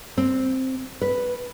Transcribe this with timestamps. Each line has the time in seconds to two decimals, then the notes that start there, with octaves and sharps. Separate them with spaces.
0.18 C4
1.01 B4